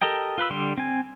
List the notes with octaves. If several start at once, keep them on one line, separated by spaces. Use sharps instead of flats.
G4 A4 A#4 D#5 G5
F4 B4 B5 E6
D3 G3 C6
C4 G#5